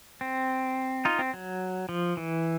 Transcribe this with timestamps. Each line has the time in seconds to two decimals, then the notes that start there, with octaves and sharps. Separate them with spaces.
0.21 C4
1.05 D#4 F4
1.19 C4
1.34 F#3
1.89 F3
2.17 E3